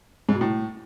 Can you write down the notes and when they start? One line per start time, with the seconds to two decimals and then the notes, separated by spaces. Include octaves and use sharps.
0.29 G#2
0.35 B2
0.41 A2